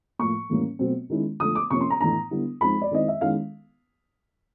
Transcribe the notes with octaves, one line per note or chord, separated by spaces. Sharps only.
A2 F3 A#3 C#6
A2 E3 G3 A#3 C#4
B2 F#3 A3 C4
D#3 G#3 C#4 E4
D3 F3 A3 D#6
D6
C3 F3 A#3 C#4 C#6
C6
A#5
A2 E3 A3 D4 A#5
D3 G3 B3 E4
F3 G#3 C4 D#4 B5
D5
D#3 G#3 C4 E4 D#5
E5
D#3 G#3 C#4 E4 F5